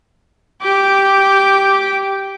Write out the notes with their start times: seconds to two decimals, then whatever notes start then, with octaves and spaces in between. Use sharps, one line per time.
0.62 G4 D6